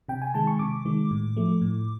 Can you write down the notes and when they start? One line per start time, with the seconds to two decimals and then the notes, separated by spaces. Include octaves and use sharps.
0.09 C3 G5
0.22 G#5
0.34 D#3 G#3 A5
0.47 C#6
0.59 C3 D6
0.85 D#3 G#3
1.11 A2
1.37 F3 A3
1.61 A2